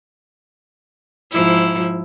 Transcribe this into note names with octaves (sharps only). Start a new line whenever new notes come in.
G#2 F3 E4